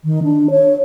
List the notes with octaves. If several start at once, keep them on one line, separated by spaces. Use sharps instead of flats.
D#3
D4
C#5